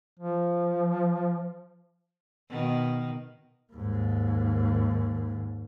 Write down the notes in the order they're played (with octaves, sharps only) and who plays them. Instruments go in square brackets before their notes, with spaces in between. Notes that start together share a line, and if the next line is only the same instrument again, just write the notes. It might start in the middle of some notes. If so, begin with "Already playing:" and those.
[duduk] F3
[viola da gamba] B2 D#3
[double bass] D#2 G#2